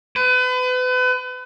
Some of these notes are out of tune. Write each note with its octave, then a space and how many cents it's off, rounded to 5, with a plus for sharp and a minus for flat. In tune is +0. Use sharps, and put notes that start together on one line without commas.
B4 +35